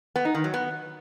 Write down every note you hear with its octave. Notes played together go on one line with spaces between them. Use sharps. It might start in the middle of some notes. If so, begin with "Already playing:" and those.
B3
D#4
D#3
F#3
B3